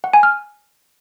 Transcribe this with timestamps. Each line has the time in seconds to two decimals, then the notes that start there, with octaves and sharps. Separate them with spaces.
0.04 F#5
0.14 G#5
0.23 F6